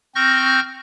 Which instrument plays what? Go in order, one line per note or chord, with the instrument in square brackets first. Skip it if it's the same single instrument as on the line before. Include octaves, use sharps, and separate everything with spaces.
[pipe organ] C4 C#6 F6 G6 A#6